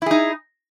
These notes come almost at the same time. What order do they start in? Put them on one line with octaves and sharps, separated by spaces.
E4 G#4 D#4